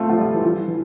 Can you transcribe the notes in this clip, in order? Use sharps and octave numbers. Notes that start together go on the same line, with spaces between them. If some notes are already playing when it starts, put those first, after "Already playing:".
Already playing: A3 C4 F4
F3
G3
E3
F3
E3